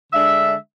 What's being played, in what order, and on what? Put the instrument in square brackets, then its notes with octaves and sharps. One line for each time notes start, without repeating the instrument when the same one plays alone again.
[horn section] D3 G#3 D4 E5